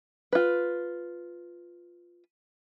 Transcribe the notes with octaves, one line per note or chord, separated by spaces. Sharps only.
F4 B4